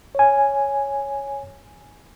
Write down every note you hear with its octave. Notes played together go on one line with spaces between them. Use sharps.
C#5 G#5